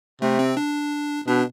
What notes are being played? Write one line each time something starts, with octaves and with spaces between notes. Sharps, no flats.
C3 A3
C4
D4
B2 D4